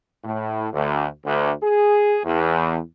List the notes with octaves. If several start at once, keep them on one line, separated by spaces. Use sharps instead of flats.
A2
D2
D2
G#4
E2